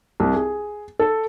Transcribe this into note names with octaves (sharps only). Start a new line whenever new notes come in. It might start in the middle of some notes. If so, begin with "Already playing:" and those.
C2
G#4
A4